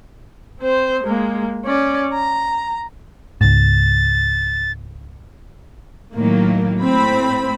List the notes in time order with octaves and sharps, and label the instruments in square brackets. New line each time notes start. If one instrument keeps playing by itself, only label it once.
[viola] C4 C5
G#3 A#3
C#4 D5
A#5
[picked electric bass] C#2 G#2 [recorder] A6
[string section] A2 D#3 F#3 A#3
A2 C4 B5